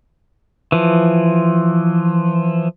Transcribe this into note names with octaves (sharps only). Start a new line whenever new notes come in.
E3 F3